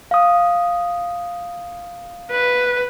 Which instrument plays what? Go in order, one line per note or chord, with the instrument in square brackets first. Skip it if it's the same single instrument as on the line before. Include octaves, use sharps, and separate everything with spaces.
[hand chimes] F5 D#6
[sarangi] B4